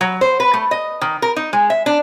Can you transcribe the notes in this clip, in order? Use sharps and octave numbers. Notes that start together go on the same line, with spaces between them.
F#3
C5
B4
A3
D#5
D#3
A#4
D#4
G#3
E5
D4